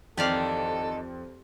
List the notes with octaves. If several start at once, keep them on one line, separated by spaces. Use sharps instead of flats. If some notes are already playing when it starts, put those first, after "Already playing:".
F2 D#3 E3 G4 A4 D5 F5